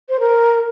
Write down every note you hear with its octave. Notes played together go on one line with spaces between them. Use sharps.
C5
A#4